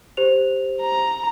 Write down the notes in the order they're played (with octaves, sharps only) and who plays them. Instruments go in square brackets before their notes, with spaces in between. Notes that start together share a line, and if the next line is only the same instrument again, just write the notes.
[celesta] G4 C5 F7
[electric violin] A#5